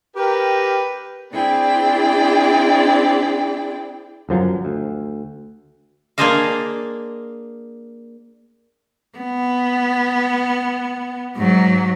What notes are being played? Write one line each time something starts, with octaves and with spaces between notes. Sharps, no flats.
G4 A#4 B4 G5
C4 D4 E4 G#4 D5 G5
G1 F#2 F3 F#3
D2
A#3 D4 G#4 C5 D#5 F5
B3
G#2 F#3